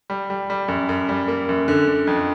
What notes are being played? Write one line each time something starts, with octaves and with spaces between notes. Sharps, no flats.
G3
G3
G3
F#2
F#2
G3
A#3
F#2
D3
D3
F2